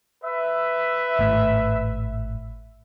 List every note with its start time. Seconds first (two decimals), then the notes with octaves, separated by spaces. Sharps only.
0.23 B4 E5
1.19 G#1 A2